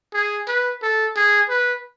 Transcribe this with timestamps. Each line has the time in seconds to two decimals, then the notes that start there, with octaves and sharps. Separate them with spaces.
0.14 G#4
0.48 B4
0.82 A4
1.16 G#4
1.49 B4